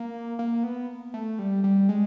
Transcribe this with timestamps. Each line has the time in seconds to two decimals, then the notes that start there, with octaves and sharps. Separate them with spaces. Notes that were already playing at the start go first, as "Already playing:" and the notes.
Already playing: A#3
0.39 A#3
0.63 B3
1.14 A3
1.39 G3
1.64 G3
1.89 G#3